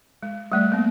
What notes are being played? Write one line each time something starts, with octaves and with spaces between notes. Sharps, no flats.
G#3
G3 A3 D5
A#3 B3